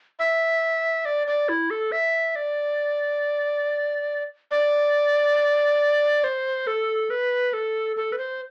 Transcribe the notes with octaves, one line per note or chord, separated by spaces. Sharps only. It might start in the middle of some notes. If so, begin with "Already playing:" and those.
E5
D5
D5
E4
A4
E5
D5
D5
C5
A4
B4
A4
A4
B4
C5